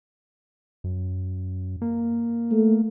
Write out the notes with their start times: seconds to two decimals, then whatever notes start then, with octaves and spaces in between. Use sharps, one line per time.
0.84 F#2
1.82 A#3
2.52 A3